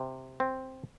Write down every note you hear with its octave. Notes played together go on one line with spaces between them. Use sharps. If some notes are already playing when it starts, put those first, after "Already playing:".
Already playing: C3
C4